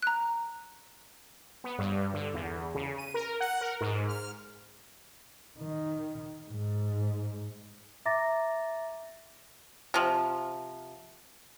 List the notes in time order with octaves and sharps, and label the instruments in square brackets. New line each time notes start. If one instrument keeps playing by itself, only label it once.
[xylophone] A#5 F#6
[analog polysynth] B3
G2
D3
E2
C#3
D#7
A#4
F#5
A#4
G#2
F6
[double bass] D#3
G#2
[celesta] E5 A#5 D6 A6 A#6
[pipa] C3 F3